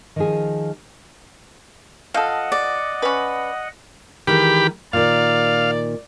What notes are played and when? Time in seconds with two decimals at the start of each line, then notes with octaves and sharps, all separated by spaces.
0.16 D#3 F3 G#4
2.14 F3 A4 D#5 F5 F#5
2.52 D5
3.02 C#4 B4
4.27 D#3 E3 G#3 G4 B5
4.93 A#2 D#3 D5 F5